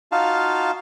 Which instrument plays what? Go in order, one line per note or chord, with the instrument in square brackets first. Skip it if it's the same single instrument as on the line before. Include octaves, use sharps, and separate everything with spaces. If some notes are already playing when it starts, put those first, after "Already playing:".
[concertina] D#4 F4 F#4 F5 A5